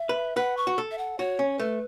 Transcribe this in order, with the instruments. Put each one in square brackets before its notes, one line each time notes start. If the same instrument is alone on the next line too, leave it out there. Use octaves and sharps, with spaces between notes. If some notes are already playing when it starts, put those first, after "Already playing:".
Already playing: [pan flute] E5
[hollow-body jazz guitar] B4
[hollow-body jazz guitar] B4 [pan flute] F#5
[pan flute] C#6
[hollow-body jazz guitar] F#4
A4
[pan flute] E5
F#5
[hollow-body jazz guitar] F#4 [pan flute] C#5
[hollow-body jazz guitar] C#4
[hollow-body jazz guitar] A3 [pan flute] B4